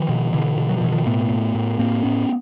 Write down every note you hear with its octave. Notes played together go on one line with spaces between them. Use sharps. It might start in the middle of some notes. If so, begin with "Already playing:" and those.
Already playing: D#3 F3
B2
B2 D3 E3
B2
F#3
F3
B2 E3
D#3 F3
A2 A3 B3
A2
A2
A2 A#3 C4
A2 B3 C#4